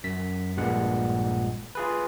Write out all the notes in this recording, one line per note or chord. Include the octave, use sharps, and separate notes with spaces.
F#2 B6
A#1 G2 A#2 G#3 F#5
F4 G#4 B4